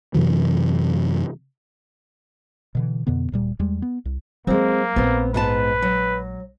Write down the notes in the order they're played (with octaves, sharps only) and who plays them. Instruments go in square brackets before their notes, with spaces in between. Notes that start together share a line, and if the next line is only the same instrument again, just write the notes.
[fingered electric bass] F#2 C3 E3 F#3
[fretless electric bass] B2 D3 E3
F2 B2 D3 B3
D1 A#2 G3
E2 G3 G#3
B3
C2
[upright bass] F#3 C#4 [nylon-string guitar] G#3 C4 [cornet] A#3
[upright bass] A#1 G#3 [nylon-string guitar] B3 C4
[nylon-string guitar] G#2 B3 A5 [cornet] B4
[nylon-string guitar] F#3